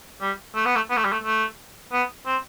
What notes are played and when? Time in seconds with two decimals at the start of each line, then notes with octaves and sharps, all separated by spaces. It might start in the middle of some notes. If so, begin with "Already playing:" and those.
0.21 G3
0.55 A3
0.65 B3
0.76 A3
0.90 B3
0.97 A3
1.05 G3
1.12 A3
1.24 A3
1.92 B3
2.26 C4